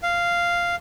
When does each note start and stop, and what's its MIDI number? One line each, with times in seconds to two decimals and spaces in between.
0.03 0.75 77